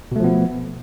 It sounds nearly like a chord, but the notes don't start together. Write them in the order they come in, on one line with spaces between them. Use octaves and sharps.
B2 A3 F3 B3